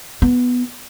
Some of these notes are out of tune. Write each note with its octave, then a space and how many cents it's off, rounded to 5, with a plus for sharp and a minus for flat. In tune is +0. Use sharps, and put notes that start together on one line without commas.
B3 +0 E4 +40